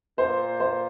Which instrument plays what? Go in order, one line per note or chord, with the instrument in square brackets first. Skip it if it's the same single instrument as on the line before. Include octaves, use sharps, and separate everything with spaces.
[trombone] A#2 [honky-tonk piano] C5
[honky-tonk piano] C5